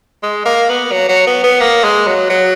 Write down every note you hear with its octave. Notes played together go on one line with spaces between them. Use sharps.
G#3
A#3
B3
F#3
F#3
B3
B3
A#3
G#3
F#3
F#3